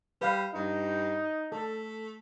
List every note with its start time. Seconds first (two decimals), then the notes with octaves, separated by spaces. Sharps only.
0.21 G3 B4 F5
0.55 G2 D#4
1.52 A3 A4